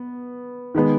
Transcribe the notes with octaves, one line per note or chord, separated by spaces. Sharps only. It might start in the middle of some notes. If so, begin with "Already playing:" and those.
Already playing: B3
D#3 G#3 B3